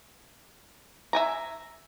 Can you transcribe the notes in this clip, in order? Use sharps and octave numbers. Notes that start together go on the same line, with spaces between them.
E5 G#5 A#5